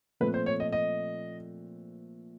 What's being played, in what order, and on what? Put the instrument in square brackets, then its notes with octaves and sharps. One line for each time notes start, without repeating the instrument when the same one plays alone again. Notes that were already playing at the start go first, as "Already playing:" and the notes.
[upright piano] A#2 F3 A3 C4 [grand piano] B4
[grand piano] C5
C#5
D#5
D#5